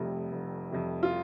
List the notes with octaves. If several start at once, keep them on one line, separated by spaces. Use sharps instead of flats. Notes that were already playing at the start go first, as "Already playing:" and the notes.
Already playing: F1 F2 C3 G3
F1
F2 C3 G3
F4